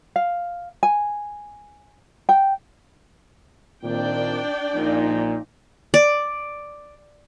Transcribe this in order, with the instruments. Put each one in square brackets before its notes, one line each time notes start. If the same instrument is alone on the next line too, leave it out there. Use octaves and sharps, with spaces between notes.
[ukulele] F5
G#5
G5
[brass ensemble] A#2 D#3 C4 [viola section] D4 D5 G5
[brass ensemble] A#1 A#2 [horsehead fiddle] D#4
[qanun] D5